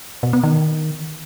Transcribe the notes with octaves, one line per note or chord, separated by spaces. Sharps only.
B2
B3
D#3